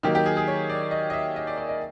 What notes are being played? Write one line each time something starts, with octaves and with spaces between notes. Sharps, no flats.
D#3 F#3 A#3 G4
G4
G#4
G#4
C#5
D5
D#5
D#5
E5
D#5
D5
D5
D#5